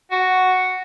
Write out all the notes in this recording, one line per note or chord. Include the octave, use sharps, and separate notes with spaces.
F#4